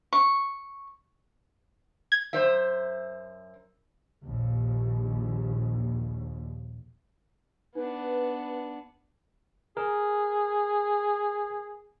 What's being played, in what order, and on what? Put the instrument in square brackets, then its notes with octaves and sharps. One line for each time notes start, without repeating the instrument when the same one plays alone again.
[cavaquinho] C#6
[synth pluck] G#6
[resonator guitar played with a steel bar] F#2 C5 E5
[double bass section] A#1 D#2
[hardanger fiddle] B3 D4 [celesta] D#4 [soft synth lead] B4
[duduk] G#4 [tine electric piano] A#4